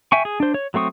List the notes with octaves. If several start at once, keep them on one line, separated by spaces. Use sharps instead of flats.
E5 G5 G#5 C#6
G#4
D4 C5
C#5
F#3 A3 C4 C#6 D#6